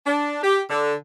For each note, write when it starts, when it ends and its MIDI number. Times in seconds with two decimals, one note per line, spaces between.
0.06 0.40 62
0.43 0.61 67
0.70 0.94 50